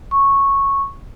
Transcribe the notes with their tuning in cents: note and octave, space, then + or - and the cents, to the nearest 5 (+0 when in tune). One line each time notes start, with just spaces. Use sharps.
C#6 -10